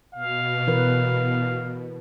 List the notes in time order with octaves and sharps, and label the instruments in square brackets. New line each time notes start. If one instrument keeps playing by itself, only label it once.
[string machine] B2 [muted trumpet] F5
[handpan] E3 A#4 B4